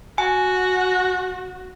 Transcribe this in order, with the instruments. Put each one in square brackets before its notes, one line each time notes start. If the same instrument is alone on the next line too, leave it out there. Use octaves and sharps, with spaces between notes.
[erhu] F#4 [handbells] G#5